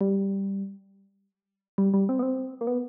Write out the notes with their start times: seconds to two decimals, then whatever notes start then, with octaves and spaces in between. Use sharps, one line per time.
0.01 G3
1.78 G3
1.94 G3
2.09 C4
2.19 B3
2.23 C4
2.61 A#3
2.67 B3